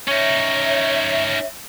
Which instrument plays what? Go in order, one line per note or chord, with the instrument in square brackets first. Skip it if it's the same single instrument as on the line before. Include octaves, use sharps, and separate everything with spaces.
[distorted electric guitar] C#4 D#4 [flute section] C#5 E5